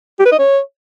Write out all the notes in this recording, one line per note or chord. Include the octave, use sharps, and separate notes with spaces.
G4
B4
D#5
C#5